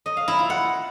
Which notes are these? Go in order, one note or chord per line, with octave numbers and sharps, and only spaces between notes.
D#5
F5
E4
F4
F#5